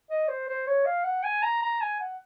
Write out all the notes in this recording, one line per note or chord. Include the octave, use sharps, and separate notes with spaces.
D#5
C5
C5
C#5
F5
F#5
G#5
A#5
A#5
G#5
F#5